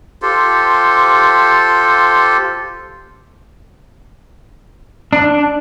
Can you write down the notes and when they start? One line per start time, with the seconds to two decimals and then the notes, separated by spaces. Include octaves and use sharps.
0.22 F4 G4 A4 C5
5.13 D4